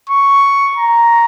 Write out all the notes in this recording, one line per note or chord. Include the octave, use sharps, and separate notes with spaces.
C#6
A#5